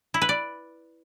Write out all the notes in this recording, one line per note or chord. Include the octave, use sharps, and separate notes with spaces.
E4
B4
D5